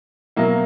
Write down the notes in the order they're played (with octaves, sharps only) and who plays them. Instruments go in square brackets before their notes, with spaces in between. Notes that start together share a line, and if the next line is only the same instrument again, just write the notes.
[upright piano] B2 F#3 A#3 E4